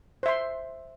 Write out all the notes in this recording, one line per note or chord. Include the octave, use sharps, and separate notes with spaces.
C5 E5 C6